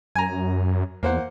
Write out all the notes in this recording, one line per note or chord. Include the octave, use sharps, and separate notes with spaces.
F#2 G#5 A#5
E2 A#3 C5 F#5